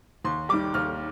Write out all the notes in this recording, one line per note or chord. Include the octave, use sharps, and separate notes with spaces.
D#2 C6
D#3 G3 D6
D#2 F6